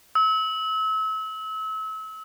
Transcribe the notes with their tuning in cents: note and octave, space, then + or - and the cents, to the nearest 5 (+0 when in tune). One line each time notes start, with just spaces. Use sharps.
E6 -35